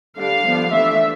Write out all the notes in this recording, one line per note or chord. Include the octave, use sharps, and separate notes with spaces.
D3 G3 D4 F5
D3 F3 B3 D4
E3 A3 D4 E5